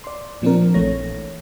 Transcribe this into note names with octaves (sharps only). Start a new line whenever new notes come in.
D5 C6
A#2 F3 C4 D4 A#4
A#1 A#2 E3 A3 C#5 A#6